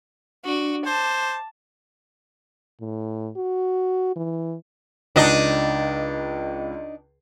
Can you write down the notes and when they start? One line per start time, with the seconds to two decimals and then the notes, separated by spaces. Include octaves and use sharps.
0.45 D4 F#4 D5
0.86 C5 A5 D6
2.81 A2
3.36 F#4
4.16 E3
5.16 C#2 D4 D#4 D#5